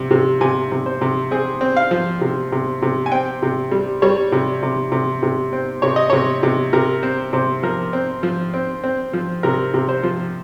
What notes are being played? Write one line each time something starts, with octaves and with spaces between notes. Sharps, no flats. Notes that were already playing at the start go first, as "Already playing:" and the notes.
Already playing: C3
C3
C3 G#5
C3
C5
C3
C4 G#4
C4
F5
F3
C3
C3
C3
G#5
C4 G5
C3
G3
G3 C#5
C3
C3
C3
C3
C4
C3 C#5
D#5
C3 C#5
C3
C3 A#4
C4 C5
C3 C5
F3 A#4
C4
F3
C4
C4
F3
C3 A#4
C3
C5
F3